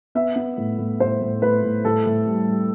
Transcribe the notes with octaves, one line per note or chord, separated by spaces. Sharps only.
B3 E5
B3
A2
A2
A2 C5
A2
A2 B4
A2
A2 A4
A2
G3
G3